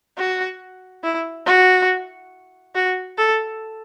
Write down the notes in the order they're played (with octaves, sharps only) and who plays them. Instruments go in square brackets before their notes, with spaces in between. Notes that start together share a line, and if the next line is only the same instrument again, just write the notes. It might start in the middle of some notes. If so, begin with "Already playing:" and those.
[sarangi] F#4
E4
F#4
F#4
A4